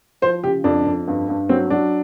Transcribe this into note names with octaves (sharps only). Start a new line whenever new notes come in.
F3 C5
C#3 G4
F2 D4
F2
G2
G2
F#3 C4
F#3 D4